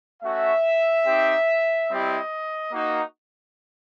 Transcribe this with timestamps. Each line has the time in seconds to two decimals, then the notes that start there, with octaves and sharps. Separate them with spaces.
0.22 A3 C#4 F#4 E5
1.06 C4 D#4 G4
1.89 G3 C4 E4 G4 D#5
2.72 A#3 D#4 F#4